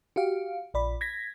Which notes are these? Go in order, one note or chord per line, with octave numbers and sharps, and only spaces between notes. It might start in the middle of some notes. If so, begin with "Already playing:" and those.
F#4 G4 F5
A#1 D5 B5
G#6 A#6 B6